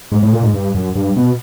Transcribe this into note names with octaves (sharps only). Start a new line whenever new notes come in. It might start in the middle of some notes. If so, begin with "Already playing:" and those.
G#2
A2
A#2
G#2
G2
F#2
G2
B2